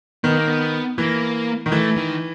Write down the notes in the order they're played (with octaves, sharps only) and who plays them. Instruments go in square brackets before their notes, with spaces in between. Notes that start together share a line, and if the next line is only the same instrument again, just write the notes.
[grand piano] D#3 [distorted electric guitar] B3
[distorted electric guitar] A#3
B3
[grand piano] E3 [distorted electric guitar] A#3
[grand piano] D#3
[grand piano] E3 [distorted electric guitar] A3
[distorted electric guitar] D#3